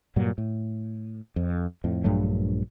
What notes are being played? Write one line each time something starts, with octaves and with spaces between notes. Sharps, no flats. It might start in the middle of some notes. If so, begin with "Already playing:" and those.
G2 A#2 F#3
A2
F2
F2 A2
A#1 G2 F#3 A3